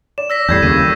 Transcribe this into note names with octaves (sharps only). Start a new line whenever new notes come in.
D5 E7
E6 A#6 B6
E2 A2 G3 G6 G#6 C7
D#2 C#3 A#3 D#7